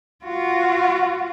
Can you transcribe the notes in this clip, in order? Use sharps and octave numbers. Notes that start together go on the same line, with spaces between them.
F4 F#4